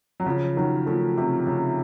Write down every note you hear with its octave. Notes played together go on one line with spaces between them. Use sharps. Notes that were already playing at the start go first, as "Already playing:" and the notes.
F#3
C#3 F3
D#3 F#3
F3 A3
C3
C#3